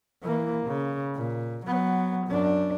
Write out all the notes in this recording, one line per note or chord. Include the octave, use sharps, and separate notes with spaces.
E3 A#3
C#3
A#2
F#3 B3
F#2 D4